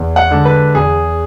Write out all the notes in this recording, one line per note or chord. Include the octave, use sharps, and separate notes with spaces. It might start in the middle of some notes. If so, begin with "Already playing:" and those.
Already playing: E2
F#5
D3 G#3 D4
B4
E2 G#4